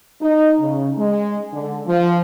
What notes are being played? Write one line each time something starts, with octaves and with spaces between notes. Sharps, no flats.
D#4
C#3
G#3
D3
F3